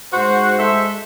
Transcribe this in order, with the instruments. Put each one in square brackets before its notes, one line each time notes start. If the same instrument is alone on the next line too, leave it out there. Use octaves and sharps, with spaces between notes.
[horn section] G#2 F#4 [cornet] C5
[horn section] G#3 A4 E5